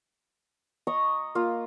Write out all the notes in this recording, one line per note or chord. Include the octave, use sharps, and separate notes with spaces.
D#5 A#5 C#6 D#6
A#3 F4